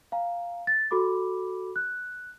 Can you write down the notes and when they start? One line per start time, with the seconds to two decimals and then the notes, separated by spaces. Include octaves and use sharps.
0.12 F5 G#5 A#5
0.67 A6
0.91 F#4 A4 B5 D6
1.76 F#6